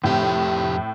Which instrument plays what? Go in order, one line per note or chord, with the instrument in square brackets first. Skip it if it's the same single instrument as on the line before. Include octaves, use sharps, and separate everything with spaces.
[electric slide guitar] F2 G4 [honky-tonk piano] A2 C4